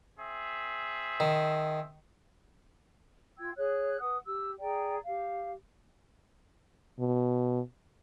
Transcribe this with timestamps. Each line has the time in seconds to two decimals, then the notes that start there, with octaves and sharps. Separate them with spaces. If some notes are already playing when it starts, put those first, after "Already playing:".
0.19 C4 G#4 E5
1.20 D#3
3.38 F4 G5 E6 G#6
3.55 G#4 C#5 F#6
3.99 B4 F#5 D#6
4.25 G4 E6
4.60 G#4 D5 G5 A#5
5.04 G4 F5
6.99 B2